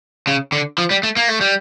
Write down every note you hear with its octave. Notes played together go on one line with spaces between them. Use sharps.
C#3
D3
F3
G3
A3
A#3
A3
G3